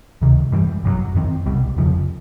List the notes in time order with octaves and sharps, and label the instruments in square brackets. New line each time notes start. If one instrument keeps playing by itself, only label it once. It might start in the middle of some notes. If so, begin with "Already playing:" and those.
[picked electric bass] D2 C3 D#3
G2 E3 G3
G#1 F#2 D#3 F#3
F#2 D#3 G#3 C4
C2 B2 G3
F1 F2 C#3 F3